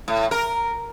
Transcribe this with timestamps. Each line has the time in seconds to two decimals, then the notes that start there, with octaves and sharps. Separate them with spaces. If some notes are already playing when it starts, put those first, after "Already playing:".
0.08 A2
0.31 A#4